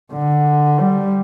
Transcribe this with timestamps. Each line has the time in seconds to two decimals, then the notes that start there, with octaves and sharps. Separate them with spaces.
0.13 D3
0.80 G3